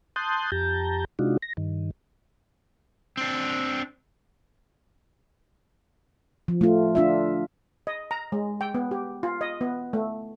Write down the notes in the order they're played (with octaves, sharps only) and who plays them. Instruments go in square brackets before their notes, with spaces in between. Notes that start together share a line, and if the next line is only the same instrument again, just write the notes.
[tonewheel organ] A5 C6 D#6 F#6 G6
F2 G4 A5 A#5 G6
C3 G#3 D4 D#4 F4 F#4
A#6
G2 D#3
[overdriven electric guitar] C4 D4
[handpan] F3
A3 F4
D4 F4 E5
[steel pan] D#5
A#5
G#3
G5
B3
G4
F4
D#5
B3
A3